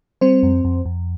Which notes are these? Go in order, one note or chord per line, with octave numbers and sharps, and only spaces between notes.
G3 C4 C5
F2
F2
F2